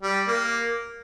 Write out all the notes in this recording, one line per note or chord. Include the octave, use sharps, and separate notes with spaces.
G3
A#3